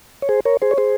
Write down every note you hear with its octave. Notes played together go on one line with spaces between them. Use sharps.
C#5
G#4 C5
A#4 C#5
G#4 C5
C#5
G#4 C5